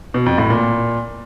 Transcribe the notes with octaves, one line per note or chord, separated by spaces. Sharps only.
B2
F2
A2
A#2